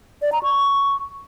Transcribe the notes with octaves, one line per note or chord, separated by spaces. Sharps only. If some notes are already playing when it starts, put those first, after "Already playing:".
D5
A#5
C#6